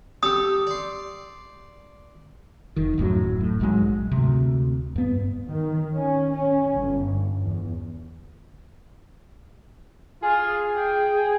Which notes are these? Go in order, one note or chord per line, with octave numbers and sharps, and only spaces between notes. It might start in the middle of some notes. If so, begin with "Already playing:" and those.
G4 A4 D#6
D5 C6
F1 D#3
D1 F#2 A2 F#3
A2
A#1 G#2 F#3 G#3
D2 C3
G2 B3
D#3
C#4
C#4
G1
E2
F4 G#4
G5